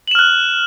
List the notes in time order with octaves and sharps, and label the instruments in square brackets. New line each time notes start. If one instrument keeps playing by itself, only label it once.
[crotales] F#7
E7
F6
F#6